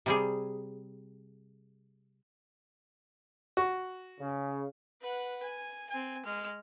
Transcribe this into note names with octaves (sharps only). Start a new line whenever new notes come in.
C3 G3 G#4
F#4
C#3
B4 F#5
G#5
C4 G#5
G#3 F6